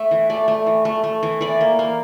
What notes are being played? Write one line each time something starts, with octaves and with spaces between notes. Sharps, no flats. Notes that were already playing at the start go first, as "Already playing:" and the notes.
Already playing: A3 E5
E3
A3 D5
A3
E3
A3
A3
E3
E3 D5
A#3
A#3